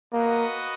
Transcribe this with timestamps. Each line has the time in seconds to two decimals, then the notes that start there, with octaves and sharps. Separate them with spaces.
0.13 A#3 B3 F#4 B4 D#5 F#5